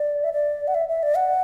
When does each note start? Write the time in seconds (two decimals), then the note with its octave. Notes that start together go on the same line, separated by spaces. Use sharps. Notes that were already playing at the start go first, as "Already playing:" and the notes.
Already playing: D5
0.24 E5
0.33 D5
0.68 F#5
0.74 E5
0.89 E5
1.03 D5
1.16 F#5